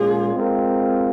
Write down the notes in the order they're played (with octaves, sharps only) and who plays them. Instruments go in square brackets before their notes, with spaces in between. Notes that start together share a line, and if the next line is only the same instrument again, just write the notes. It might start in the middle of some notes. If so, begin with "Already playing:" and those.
Already playing: [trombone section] A#2 G#3 C#4 F4 [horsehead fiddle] G#4
[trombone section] G#3 C4 F4 A#4